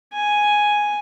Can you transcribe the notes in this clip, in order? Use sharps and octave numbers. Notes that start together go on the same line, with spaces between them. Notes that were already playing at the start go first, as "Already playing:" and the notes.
G#5